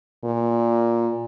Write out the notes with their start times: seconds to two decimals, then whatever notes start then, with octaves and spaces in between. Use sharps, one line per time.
0.24 A#2